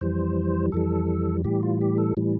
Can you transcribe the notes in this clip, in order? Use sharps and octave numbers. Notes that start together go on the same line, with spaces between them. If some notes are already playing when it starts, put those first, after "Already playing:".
F2 E3 G3 C5
F2 E3 G3 A4
A2 E3 G3 G4
F4
G4
A4
A2 E3 G3